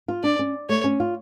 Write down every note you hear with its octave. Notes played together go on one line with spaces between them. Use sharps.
F4
D4 D5
C#4
A3 C#5
C#4
F4